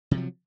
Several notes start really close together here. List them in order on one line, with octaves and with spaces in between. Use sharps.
C3 F3 F#3